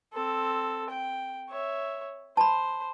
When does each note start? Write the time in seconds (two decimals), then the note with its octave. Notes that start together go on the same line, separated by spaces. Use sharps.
0.13 C4 A4
0.90 G5
1.49 C#5 E5
2.37 C5 A5 B5